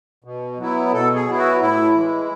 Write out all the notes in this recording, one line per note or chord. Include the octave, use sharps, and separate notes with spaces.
B2
F#3 B3 E4
B2 A4
G#4
F#3 B3 E4
F#4
A2 E4
E3 G#3